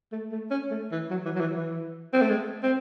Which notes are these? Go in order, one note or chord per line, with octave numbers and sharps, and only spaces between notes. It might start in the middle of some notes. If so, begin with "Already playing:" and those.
A3
A3
C#4
A3
E3
F#3
E3
F#3
E3
E3
C4
A3
G#3
C4